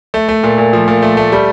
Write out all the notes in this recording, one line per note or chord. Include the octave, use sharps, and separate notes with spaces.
A3
A3
A#2
A#2
F3
A#2
A3
A3
G3